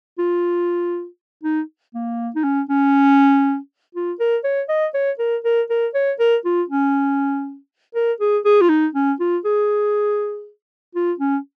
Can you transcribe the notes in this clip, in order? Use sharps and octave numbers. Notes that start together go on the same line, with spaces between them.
F4
D#4
A#3
D#4
C#4
C#4
F4
A#4
C#5
D#5
C#5
A#4
A#4
A#4
C#5
A#4
F4
C#4
A#4
G#4
G#4
F4
D#4
C#4
F4
G#4
F4
C#4